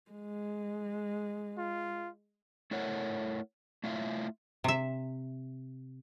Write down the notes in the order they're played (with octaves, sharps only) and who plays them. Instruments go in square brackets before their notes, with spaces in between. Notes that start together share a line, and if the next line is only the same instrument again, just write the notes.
[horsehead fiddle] G#3
[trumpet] F4
[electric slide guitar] A3 E4 A4 A#4 C#5 F#5
A3 E4 F4 E5
[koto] C3 E5